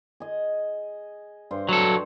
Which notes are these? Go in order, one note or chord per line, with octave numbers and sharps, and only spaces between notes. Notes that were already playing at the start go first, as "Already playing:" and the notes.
G#4 D#5
G2 C5
F#3 A4